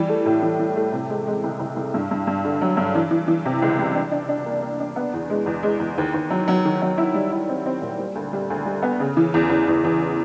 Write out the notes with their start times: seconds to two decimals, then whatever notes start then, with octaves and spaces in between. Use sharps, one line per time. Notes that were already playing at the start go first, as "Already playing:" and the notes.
Already playing: E3 G3
0.09 A3
0.26 A2
0.43 E3
0.59 E3
0.76 A3
0.92 C3
1.10 G#3
1.27 G#3
1.44 C2
1.59 C2
1.76 C2
1.94 G2
2.11 G2
2.27 G2
2.45 D3
2.61 F#3
2.77 G2
2.95 E3
3.11 E3
3.28 E3
3.45 C3
3.62 C#2
3.79 G3
3.95 D4
4.12 D4
4.29 D4
4.46 A#3
4.62 A#3
4.80 D4
4.96 B3
5.14 E2
5.30 G#3
5.46 E2
5.63 G#3
5.80 E2
5.98 D#2
6.14 D#2
6.30 F#3
6.48 F#3
6.65 D#3
6.82 F#3
6.98 E4
7.14 G3
7.32 E4
7.49 C4
7.66 C4
7.82 A#2
7.99 G3
8.15 D2
8.33 G3
8.50 D2
8.66 G3
8.82 B3
9.00 C#3
9.17 E3
9.34 E2
9.50 E2
9.68 E2
9.84 E2